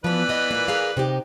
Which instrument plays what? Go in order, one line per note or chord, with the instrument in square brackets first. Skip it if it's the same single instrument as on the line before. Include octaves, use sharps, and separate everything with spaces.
[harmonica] E3 B4 D5 [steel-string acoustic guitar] F3 B3
[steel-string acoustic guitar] B3 D#5
A#2 A#3
G#4 A#4 F5
C3 D#4 G4